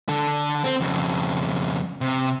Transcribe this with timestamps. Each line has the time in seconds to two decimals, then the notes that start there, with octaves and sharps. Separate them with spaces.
0.09 D3 A4
0.64 C4
0.81 F2 C#3
2.01 C3